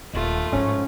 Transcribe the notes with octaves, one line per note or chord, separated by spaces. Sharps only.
D#1 D#2 A3 F4
A1 G#2 F3 C#4